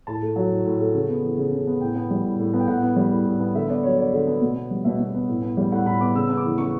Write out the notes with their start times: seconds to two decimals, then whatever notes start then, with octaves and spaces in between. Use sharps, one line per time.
0.07 A2 A5
0.22 A3
0.36 F#3
0.51 A2
0.65 A2
0.80 A3
0.94 C#3
1.09 B3
1.23 E3
1.37 C#3
1.53 C#3
1.67 B3
1.80 A2 G5
1.95 B3
2.11 G3
2.24 A2
2.39 A2
2.53 B3
2.59 G5
2.68 A2 F#5
2.82 B3
2.96 G3
3.11 A2
3.25 A2
3.40 B3
3.55 D3 E5
3.69 B3 D5
3.83 F#3 C#5
3.98 D3 D5
4.13 D3
4.27 B3
4.41 B2
4.56 B3
4.71 G3
4.84 B2 E5
4.99 B2
5.14 B3
5.28 A2
5.43 B3
5.57 G3
5.72 A2 F#5
5.86 A2 B5
6.01 B3 D6
6.15 C#3 E6
6.27 B3 E6
6.37 D6
6.45 E3
6.58 C#3 C#6